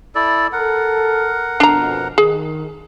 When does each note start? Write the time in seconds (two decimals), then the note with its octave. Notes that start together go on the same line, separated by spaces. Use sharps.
0.15 E4 A4 D5
0.53 A4 A#4 F#5
1.60 F2 B2 D4 A#5
2.18 D#3 G#4